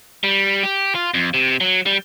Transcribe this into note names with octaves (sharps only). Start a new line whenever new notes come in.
G3
G4
F4
F2
C3
F#3
G3